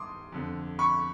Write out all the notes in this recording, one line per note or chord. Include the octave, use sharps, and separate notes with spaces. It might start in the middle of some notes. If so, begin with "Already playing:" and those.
Already playing: G2 D#3 C6 D6 D#6
F2 D3
B5 C#6